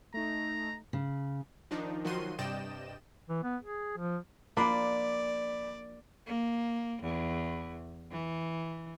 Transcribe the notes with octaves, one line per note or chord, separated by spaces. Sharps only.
A3 D#4 A#5
C#3
D#3 F3 D4 D#4
D#3 F3 F#3 F#4 C6 D#7
G2 C3 D5 D#5 G5 E7
E3
B3
G#4
F3
F3 A#3 D4 D5 B5 D6
A#3
E2
E3